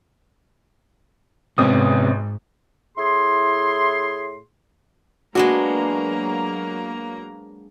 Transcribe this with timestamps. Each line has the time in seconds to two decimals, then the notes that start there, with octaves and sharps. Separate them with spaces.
1.58 G#1 G#2 C3 B3 C#4 D#6
2.98 A2 E4 G#4 C6
5.35 F#3 G#3 A#3 B3 D4 F#4 A#5